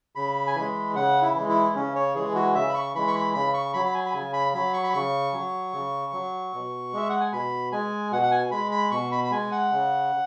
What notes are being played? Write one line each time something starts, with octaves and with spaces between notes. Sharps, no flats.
C#3 B5
G#5
E3 G#3 B5
C#3 F#5
E4
E3
G#3
E4
C#3 C#4
C#5
E3 G#3 G#4
F#4
C#3 E5
B5
C#6
E3 G#3 B5
C#6
B5
C#3 B5
C#6
F#3 B5
B5
G#5
B5
C#3 G#5
B5
F#3 B5
C#6
B5
C#3 C#6
F#3
C#3
F#3
B2
G#3 E5
F#5
G#5
B2 B5
G#3 G#5
B2 F#5
F#5
G#5
G#3 B5
B5
B2 C#6
B5
B5
G#3 G#5
F#5
C#3